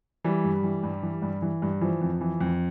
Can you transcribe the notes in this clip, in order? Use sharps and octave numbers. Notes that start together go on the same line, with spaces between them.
E3 G3
G2
E3
G2
E3
G2
E3
G2
E3 F3
F2
E3
F2